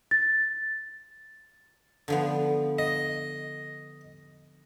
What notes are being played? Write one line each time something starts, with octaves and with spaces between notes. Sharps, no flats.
A6
D3 F3 B3
D#5